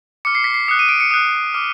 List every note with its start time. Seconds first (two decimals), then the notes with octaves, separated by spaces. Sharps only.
0.25 D6 F6 C#7
0.35 C7
0.44 B6
0.54 C7
0.68 D#6 C#7
0.71 F#6
0.79 D#7
0.89 D7
1.00 C#7
1.11 D#6 F#6
1.54 D6 F6